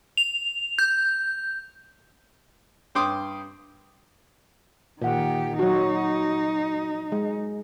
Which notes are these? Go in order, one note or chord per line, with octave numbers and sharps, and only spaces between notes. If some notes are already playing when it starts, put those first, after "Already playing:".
F7
G6
G2 G5 C6 D6 D#6
A#2 D#3 G4 F#5
F#3 D#4 F#4
G#3